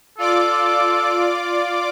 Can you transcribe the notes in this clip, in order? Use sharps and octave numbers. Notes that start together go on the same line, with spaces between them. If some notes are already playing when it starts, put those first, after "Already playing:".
F4 A4 D5 D6